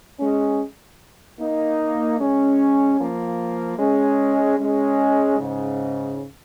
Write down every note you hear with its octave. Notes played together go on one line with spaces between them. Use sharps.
G#3 C#4
A#3 D#4
G#3 C#4
F3 A#3
G#3 C#4
G#3 C#4
G#2 C#3